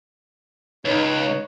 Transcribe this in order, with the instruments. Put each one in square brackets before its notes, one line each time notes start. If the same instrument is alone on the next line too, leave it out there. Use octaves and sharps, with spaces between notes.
[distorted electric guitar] C#2 [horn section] D#4 B4 [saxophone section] C#5